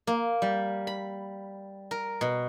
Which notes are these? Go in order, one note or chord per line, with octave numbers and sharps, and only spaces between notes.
A#3
G3
B5
A#4
B2